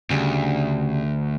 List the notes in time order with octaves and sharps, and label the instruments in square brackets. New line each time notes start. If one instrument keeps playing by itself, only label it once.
[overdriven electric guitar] D2 [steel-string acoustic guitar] C#3 G3 D4